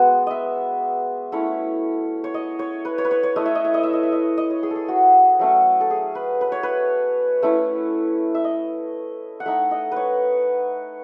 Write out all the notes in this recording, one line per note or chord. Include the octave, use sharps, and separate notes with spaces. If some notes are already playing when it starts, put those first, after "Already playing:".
Already playing: G#3 B3 F#4
D#5 E5
A3 C#4 E4 C#5
C#5
D#5
C#5
B4
C#5
B4
C#5
C#5
A3 E4 D#5
E5
D#5
E5
D#5
E5
D#5
E5
D#5
D#5
C#5
G#4
A4
G#4
F#4
F#3 A3 C#4
A4
G#4
B4
B4
C#5
B4
A3 C#4 E4
E5
D#5
F#5
A3 D#4 E5
D#5
B4 C#5